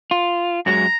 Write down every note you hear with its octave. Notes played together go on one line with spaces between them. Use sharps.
F4
F#2 F#3 G#3 A#5